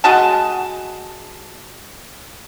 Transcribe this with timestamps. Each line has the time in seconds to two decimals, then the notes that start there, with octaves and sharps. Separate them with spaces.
0.04 G#3 F#4 A5